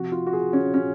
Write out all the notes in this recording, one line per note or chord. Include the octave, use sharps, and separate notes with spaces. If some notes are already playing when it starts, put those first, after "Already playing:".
Already playing: C3 F3 F#4
F4
F#4
G#4
C#4
C#4